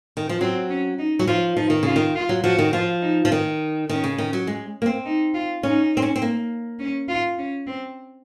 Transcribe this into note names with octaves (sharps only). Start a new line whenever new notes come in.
D#3
F3
F#3 C4
C#4
D#4
F#3
F3 F4
F3 D#4
D#3
C#3 F4
D#3
F4
F#3
F3 F#4
D#3
F3 F4
D#4
F3
D#3
D#3 C#4
C#3
D#3
F#3
G#3
A#3
C4
D#4
F4
C#4 D#4
C4
C#4
C4
A#3
C#4
F4
C#4
C4